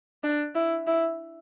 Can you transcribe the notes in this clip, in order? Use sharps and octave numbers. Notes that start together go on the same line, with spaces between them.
D4
E4
E4